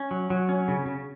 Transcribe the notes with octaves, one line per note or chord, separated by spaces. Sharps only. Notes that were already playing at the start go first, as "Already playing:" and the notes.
Already playing: C#4
F#3
F#3
C#4
C#3
C#3